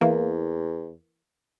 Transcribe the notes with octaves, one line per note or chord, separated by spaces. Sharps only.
E2 E3 A#3